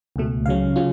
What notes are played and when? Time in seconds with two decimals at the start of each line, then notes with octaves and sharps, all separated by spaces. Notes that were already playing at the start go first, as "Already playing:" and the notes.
0.16 C#2 B2 A3
0.46 C#2 C#3 F#3 C#4 F5
0.76 C#3 F#3 C#4 F4